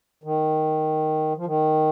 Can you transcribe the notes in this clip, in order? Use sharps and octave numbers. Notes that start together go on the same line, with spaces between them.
D#3
F3
D#3